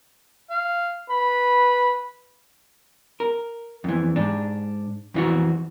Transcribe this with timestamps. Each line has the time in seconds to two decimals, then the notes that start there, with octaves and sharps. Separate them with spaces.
0.50 F5
1.10 B4 B5
3.20 A#4
3.84 F2 E3
4.16 G#2 D4
5.14 F2 E3 F#4